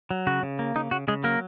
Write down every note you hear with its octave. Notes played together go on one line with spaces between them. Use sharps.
F#3
C#3 F#4
C#3
A#3
C#3 D#4
C#3 F#4
C#3 G#3 G#4
F#3 A#3 A#4